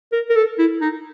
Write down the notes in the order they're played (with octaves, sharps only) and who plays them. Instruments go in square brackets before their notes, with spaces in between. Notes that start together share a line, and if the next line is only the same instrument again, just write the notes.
[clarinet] A#4
A#4
A4
E4
D#4